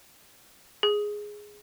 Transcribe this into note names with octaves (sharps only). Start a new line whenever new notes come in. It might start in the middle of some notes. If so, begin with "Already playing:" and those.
G#4